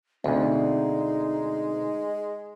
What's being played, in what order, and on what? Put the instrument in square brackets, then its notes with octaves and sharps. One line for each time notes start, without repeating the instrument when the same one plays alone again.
[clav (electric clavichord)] D2 [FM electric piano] B2 D3 C4 [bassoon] G#3 [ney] D#4